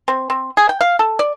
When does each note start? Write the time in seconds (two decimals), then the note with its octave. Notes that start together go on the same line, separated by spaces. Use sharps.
0.08 C4
0.30 C4
0.57 G#4
0.69 G5
0.81 F5
0.99 A4
1.19 D5